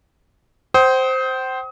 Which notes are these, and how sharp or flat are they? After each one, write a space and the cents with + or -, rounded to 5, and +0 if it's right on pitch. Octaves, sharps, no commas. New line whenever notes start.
C5 +0 G5 -40 D#6 +35